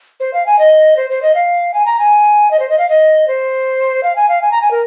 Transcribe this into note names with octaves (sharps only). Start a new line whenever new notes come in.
C5
F5
G#5
D#5
C5
C5
D#5
F5
G#5
A#5
G#5
D#5
C5
D#5
F5
D#5
C5
F5
G#5
F5
G#5
A#5
G#5
A#4